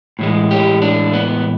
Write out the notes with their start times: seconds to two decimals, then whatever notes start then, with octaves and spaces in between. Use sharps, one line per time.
0.19 A2 E3 G#3
0.51 G4
0.82 D4
1.13 B3